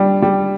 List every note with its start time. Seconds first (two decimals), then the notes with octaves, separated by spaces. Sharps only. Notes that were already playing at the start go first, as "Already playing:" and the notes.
Already playing: G3 D4
0.22 G3